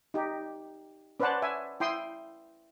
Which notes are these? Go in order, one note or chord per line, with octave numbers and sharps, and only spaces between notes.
D#4 G4
C#4 B4 C5 D5 F#5 A5
E5 G#5
E4 G5 C6 D#6